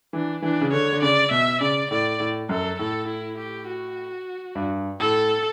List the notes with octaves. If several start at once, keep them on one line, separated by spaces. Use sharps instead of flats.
E3 D4
E3 D4
C#3
D3 C#5
D3
C#3 D5
B2 E5
C#3 D5
A2 D5
A2
F#2 A4
A2 A4
E4
G4
F#4
G2
A2 A4